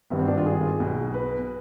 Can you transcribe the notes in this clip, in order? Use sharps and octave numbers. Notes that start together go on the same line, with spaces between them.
G#1 G2 D#3 B3
C4
D4
F4
G#4
B1 B2
B4